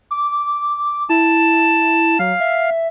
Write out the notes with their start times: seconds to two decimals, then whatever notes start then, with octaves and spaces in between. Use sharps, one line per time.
0.11 D6
1.10 E4 A5
2.19 F#3 F5
2.40 E5